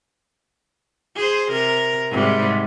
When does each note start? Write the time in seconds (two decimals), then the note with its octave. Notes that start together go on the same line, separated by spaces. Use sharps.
1.16 G#4 C5
1.51 C3 A#4
2.10 G#2 C3 G3